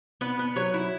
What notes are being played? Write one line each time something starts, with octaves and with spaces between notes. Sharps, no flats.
B3 B4
B3
F#3 C#5
E4